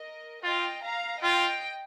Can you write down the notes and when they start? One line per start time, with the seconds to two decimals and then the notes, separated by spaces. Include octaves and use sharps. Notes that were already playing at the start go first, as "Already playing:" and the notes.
Already playing: A#4 D#5
0.43 F4 D#5 G5
0.83 F5 A#5
1.22 F4 D#5 G5